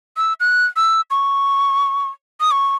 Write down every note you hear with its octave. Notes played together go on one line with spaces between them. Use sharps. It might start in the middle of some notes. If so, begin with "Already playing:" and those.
E6
F#6
E6
C#6
D#6
C#6